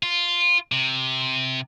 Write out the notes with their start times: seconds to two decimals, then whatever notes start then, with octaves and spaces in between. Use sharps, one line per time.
0.03 F4
0.72 C3